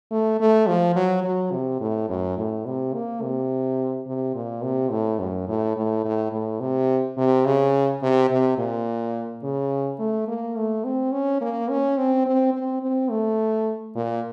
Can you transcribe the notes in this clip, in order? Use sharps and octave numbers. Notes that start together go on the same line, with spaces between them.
A3
A3
F3
F#3
F#3
C3
A2
F#2
A2
C3
A#3
C3
C3
A#2
C3
A2
F#2
A2
A2
A2
A2
C3
C3
C#3
C3
C3
A#2
C#3
A3
A#3
A3
C4
C#4
A#3
C#4
C4
C4
C4
C4
A3
A#2